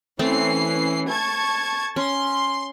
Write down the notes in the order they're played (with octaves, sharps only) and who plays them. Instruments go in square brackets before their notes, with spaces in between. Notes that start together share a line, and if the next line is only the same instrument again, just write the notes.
[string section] E3 C#4 C7 [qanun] A3 C4
[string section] A5 C#6 G#6
[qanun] C#4 [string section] C6